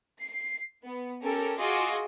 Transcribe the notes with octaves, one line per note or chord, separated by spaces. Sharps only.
C7
B3
C#4 G4 A4 A#4
F4 F#4 G#4 D#5 C6 D6